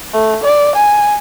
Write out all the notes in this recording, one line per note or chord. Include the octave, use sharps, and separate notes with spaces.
A3
D5
G#5